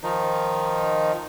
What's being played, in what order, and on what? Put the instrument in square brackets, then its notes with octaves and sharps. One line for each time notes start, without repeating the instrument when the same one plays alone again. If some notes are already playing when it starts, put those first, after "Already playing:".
[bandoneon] D#3 F3 D#4